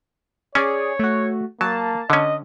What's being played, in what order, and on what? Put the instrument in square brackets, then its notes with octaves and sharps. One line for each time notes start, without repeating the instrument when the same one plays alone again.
[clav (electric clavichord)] C#4 [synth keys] G#4 D5 [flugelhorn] C#5
[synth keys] A3 F#4
[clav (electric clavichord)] F#3 [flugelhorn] A#3 [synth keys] A5
[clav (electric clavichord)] D3 C#4 [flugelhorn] D#5